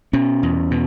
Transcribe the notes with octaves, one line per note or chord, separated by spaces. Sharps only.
B2 C#4
E2
B2